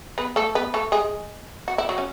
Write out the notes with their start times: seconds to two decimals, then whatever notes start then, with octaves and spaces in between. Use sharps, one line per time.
0.18 B3 B4
0.36 A3 A4
0.55 B3 B4
0.74 A3 A4
0.92 G#3 G#4
1.68 F#4
1.78 E4
1.89 F#3 F#4
1.98 C#4